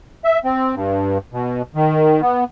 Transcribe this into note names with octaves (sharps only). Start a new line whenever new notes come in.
E5
C4
G2
B2
D#3
B3